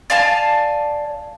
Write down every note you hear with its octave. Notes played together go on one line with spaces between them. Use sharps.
D5 F5 G#5 A5